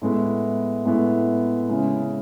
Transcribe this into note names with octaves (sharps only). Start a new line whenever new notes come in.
A2 G#3 B3 E4
A2 G#3 B3 E4
C#3 G#3 C#4 E4